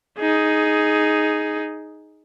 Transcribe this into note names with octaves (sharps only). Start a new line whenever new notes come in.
D#4 G#4